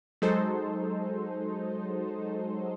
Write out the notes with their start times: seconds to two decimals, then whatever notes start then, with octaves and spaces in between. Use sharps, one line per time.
0.22 F#3 G#3 D#4 A4 C5